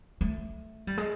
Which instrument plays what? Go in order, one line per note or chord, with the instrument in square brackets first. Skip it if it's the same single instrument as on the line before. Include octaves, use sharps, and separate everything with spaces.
[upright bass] A3
G3
G#3